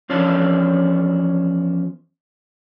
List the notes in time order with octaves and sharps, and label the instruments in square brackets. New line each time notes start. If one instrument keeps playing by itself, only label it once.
[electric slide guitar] E2 F3 C#4 D4 A5